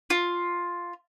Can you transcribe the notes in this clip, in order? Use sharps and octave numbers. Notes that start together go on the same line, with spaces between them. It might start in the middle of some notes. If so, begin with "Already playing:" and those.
F4